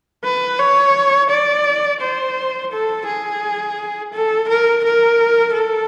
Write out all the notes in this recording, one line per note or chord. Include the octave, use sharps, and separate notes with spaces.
B4
C#5
D5
C5
A4
G#4
A4
A#4
A#4
A4